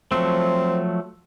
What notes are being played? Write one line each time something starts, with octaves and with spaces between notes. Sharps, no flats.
F3 F#3 A3 C4